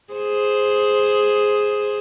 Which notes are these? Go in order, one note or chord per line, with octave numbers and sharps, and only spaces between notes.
G#4 C5